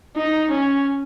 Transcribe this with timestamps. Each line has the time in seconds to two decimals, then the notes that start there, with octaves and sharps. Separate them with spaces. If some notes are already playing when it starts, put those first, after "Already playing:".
0.17 D#4
0.51 C#4